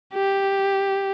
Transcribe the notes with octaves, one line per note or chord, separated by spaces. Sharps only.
G4